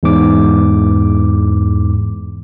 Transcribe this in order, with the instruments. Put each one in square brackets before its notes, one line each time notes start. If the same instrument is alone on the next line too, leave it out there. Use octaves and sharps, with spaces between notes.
[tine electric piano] E2 G#2 D6